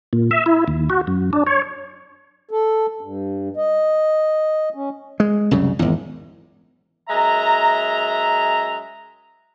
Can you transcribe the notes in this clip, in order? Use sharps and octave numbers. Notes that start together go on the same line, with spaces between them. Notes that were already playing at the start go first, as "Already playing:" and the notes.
A#2
E5
E4
D#2
F#4
F#2
D4
C#5
A4
G2
D#5
C#4
G#3
C2 F#2 C#3
G#1 E2
F#2 G#3 E5 A#5